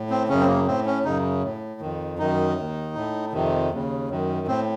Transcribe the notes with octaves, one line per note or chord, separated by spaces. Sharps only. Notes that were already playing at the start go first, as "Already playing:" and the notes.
Already playing: A2
C4
F#2 C#3 C#4
C4
A#3
A2 C4
C#4
F#2 C#3 D#4
A2
F2 D#3
F#2 D#3 D#4
D#2 D#3
A2
F2 C3 D#3
D#2 C#3
F#2 D#3
A2 C4